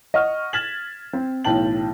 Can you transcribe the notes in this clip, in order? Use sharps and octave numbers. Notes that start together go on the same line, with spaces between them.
D#5 F#5 C#6 F6
F6 G#6 A6 B6 E7 F#7
C4
B1 A2 E3 G5 A5 F#7